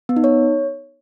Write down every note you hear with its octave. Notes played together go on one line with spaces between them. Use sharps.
B3
D#4
C#5